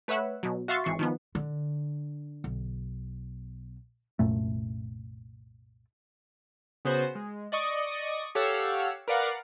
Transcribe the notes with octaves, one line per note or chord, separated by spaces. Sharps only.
A3 B4 C#5 E5 F#5
B2 F#3
F#4 E5 F5 C6 C#6 A6
G#1 E3 C#6 C7
D#3 F3 B3
D3
B1
C2 F#2 A#2 A3
C#3 B3 F#4 C5
G#3
D5 D#5 C#6 D#6
G4 A4 C#5 F5 F#5 E6
A#4 B4 D5 F5 F#5